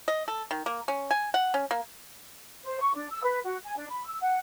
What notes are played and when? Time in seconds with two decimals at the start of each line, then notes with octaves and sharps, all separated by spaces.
0.08 D#5
0.28 A4
0.51 D#3
0.66 A#3
0.88 C#4
1.11 G#5
1.34 F#5
1.54 C#4
1.71 A#3
2.64 C5
2.80 C#6
2.94 D4
3.10 E6
3.24 B4
3.44 F#4
3.63 G#5
3.76 D4
3.90 B5
4.05 E6
4.22 F#5